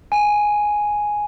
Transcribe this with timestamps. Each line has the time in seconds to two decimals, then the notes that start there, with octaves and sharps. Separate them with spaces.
0.12 G#5